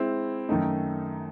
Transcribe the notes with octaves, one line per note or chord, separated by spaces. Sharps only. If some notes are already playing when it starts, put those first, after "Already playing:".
Already playing: G#3 C4 E4
F#2 D#3 A3 D#4